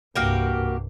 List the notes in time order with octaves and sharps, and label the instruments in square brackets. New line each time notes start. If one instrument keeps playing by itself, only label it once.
[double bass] C2 G2 [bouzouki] A#3 F#4 G4